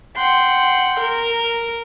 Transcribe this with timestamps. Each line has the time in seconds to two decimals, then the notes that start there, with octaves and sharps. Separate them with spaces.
0.15 F#5 G5 C6
1.00 A#4